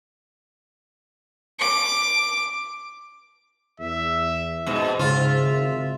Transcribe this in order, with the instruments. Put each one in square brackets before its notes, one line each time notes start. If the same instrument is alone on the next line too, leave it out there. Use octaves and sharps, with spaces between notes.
[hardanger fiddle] D6
[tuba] E2 [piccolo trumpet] E5
[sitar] G#2 B2
[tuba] G#2 [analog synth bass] C#3 [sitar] F4 [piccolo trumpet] E5
[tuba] G#1